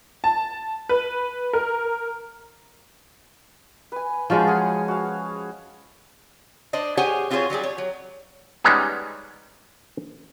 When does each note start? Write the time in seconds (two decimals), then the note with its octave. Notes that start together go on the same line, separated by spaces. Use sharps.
0.24 A5
0.89 B4
1.53 A#4
3.92 B4 G#5
4.30 F3 F#3 G#3 C#4 F4 C5
4.47 G#4 F#5 G#5
4.88 F#4 F5
6.73 D4 C5 D5 D#5
6.97 G4 G#4 C5 C#5 F#5 G#5
7.30 C4 F4 F#4 G#4 C5 C#5
7.50 F#3 G3 G4 G#4
7.63 C#5
7.78 F#3
8.64 G3 G#3 B3 C#4 D#4 G#4